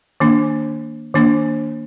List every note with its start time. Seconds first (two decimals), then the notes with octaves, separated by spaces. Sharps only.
0.20 D#3 A#3 D4
1.14 D#3 A#3 D4